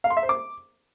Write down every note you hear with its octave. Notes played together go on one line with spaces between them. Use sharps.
F5
C6
E5
C5
D6